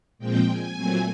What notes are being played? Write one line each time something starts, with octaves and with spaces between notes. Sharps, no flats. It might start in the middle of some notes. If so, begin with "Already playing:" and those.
A#2 F3 G#3 C4 G5
G#5
A#2 F#3 A3 C4